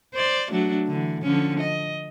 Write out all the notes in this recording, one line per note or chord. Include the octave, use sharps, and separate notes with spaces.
C5 D5
F#3 A3 D4
D3 E3
D3 F3 C#4
D#5